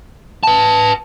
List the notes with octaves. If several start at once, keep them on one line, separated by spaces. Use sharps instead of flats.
B4 A5